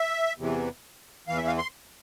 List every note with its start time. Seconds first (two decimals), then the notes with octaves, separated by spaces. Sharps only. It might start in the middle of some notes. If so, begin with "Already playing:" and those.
Already playing: E5
0.37 E2 C3 E3
1.28 E2 E3 F5
1.37 E5
1.47 F5
1.58 C6